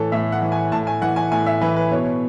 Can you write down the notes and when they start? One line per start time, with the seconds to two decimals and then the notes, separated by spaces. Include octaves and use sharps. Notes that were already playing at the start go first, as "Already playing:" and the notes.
Already playing: A2 E3 A4 C#5
0.12 A2 E5
0.32 F#5
0.42 E3
0.52 G#5
0.72 A2 A5
0.87 G#5
1.01 E3 F#5
1.16 G#5
1.32 A2 G#5
1.46 E5
1.61 E3 B4
1.76 B4
1.91 B2 C#5